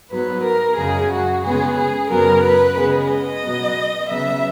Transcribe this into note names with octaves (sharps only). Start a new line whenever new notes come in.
G#2 F#3 B3 B4
A#4
F#2 C#3 G#3 G#4
F#4
C#3 G#3 B3 G#4
G#4
F#2 C#3 F#3 B3 A#4
B4
C#3 G#3 B3
D#5
B2 F#3 B3
C#3 F#3 B3 E5